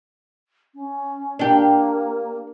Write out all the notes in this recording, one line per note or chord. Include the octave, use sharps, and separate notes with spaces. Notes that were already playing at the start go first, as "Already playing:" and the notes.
C#4
A#3 D4 G4